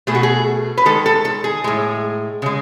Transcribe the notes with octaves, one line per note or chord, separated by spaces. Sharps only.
B2 A3 G#4
F#4
G#4
B4
D#3 G#3 A4
A4
A4
G#4
A2 G#3
C#3 G#3